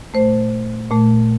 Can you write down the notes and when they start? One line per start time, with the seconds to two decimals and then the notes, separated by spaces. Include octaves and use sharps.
0.14 A#2 A3 C5
0.90 A#2 A3